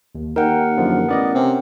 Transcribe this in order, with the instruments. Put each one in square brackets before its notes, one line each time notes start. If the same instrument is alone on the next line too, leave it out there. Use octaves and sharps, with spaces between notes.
[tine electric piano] D#2
[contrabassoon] D#2 [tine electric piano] D#4 G5 [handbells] A#4 F#5
[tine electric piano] F#2 D3 F3
[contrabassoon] A1 [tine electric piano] B3 D5 D#5
[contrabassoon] C3 [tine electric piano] C4 C#4